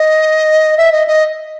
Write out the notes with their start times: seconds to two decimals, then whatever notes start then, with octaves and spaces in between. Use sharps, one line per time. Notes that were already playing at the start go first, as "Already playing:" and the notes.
Already playing: D#5
0.77 E5
0.92 D#5
1.08 D#5